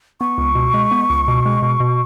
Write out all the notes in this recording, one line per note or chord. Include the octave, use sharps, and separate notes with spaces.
B3 C#6
C#2
B2
G#3
B3
C#2
B2
G#3
B2
B2